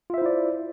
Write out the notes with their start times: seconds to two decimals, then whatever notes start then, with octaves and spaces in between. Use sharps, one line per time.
0.10 F4
0.14 E5
0.18 C5
0.22 E4
0.26 D5